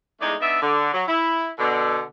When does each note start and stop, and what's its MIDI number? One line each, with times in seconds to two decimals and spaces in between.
0.20 0.34 40
0.20 0.34 56
0.20 0.34 57
0.20 0.34 62
0.20 0.34 63
0.20 0.34 74
0.40 0.59 59
0.40 0.59 62
0.40 0.59 63
0.40 0.59 76
0.61 0.92 50
0.93 1.02 54
1.07 1.50 64
1.59 2.03 47
1.59 2.03 50